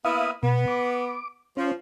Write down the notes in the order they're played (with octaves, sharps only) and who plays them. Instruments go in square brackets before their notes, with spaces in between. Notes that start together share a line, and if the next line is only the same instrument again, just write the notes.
[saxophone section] A#3 B3 E4 [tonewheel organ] E5 F5 D#6
[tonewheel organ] B2 [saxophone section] B3
[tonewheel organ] D6
[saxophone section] F3 [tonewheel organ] C#4